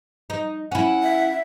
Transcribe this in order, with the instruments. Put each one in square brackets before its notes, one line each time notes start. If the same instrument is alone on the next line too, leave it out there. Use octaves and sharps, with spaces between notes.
[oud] D#4
[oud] C#4 E4 [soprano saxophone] F#5
[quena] E5